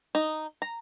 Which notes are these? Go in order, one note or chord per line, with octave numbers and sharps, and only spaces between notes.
D#4
A#5